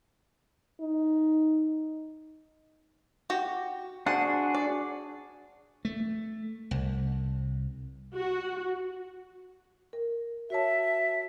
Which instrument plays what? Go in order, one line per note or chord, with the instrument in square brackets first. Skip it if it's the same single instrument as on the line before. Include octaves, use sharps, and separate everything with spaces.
[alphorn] D#4
[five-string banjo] F#4 G4
[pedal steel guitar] D4 F#4 G#4 [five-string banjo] C5 F#5
[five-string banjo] D5
[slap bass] A3
C2
[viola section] F#4
[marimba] A#4
[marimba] F#4 C#5 A5 [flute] E5